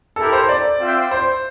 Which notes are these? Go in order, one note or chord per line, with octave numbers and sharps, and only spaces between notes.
E4 G4 A4 A#4
C5
D5
C4 F4 C5 E5 G5
C5